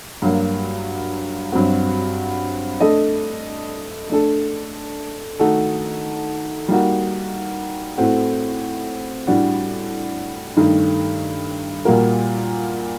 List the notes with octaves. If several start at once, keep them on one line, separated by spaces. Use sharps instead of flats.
G2 F#3 A#3
G2 F#3 C4 F#4
A3 D4 A4 D#5
A3 D4 A4
D#3 A3 D#4 F#4 A4
G3 A#3 D#4 F#4
A2 A3 C4 F#4
A2 G3 D4 F#4
G2 D#3 A3 D#4
A#2 G3 A#3 F#4 A#4